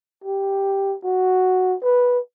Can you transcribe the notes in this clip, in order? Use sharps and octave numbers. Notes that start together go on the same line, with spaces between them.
G4
F#4
B4